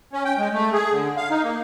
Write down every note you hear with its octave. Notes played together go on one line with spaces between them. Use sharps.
C#4
G5
G#3
A3
G#4
D3
F5
D#4
A#3